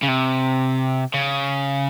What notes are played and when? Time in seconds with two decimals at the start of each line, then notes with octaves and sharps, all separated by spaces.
0.02 C#3
0.08 C3
1.14 C#3